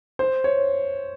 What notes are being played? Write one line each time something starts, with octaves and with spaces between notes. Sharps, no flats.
C5
C#5